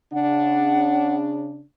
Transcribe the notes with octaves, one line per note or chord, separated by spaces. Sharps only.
C#3 D4 F#5